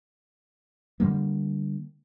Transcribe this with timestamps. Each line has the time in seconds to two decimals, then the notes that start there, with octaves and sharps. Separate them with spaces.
1.00 D3 D#3 G3 A#3